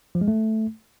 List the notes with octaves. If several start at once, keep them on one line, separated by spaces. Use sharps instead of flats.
F3
G#3
A3